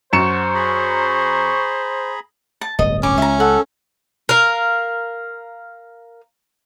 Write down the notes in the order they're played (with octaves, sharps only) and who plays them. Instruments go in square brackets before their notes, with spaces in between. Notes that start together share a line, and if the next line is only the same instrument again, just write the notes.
[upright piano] F#2 C#7 E7 [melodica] F#4 [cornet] C5 [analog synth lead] C#6
[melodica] G#4 A#5 B5
[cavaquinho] A5
[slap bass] D1 G1 [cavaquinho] D#5
[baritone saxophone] C#4 [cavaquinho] D6
[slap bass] C#2 [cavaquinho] E5 A#5
[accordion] A4 [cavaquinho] F#5
[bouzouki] A#4 F5